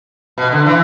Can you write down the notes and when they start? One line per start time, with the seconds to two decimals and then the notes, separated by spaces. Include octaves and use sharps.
0.38 B2
0.52 D3
0.66 E3